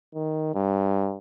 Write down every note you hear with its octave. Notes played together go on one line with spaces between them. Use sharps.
D#3
G2